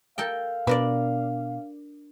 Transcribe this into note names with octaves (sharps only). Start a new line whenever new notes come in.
A4 A#4 F5 G5
B2 D4 A#4 B4 D5